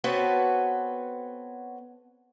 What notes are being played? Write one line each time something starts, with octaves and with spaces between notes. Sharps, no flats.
B3 C4 F#4 A4 B4 C#5